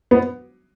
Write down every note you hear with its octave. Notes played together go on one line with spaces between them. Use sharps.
B3